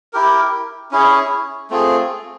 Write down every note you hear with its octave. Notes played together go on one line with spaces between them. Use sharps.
E4 G4 A#4
C#4 E4 G#4 C#5
A3 C4 F4 G#4